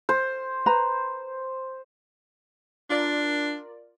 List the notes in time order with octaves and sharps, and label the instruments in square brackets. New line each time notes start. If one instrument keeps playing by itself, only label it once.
[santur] C5
[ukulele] B4 A#5 B5
[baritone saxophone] D4 [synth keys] F4 A#4 D5